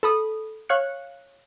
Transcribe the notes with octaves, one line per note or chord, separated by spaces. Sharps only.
A4 B5 D#6
C#5 F5 F#6 C#7